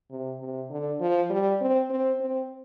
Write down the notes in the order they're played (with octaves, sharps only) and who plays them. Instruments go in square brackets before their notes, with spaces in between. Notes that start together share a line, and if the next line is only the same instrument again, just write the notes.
[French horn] C3
C3
D3
F3
G3
C4
C4
C4